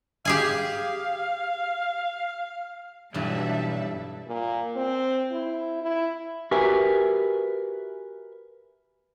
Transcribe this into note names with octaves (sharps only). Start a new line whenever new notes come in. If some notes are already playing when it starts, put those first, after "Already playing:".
G4 G#4 F5 G#5
B1 G2 E3 F#3 G3 D5 E5 A5
A#2
C4
E4
E4
F#4 G4 A#4 B4 E5 G#5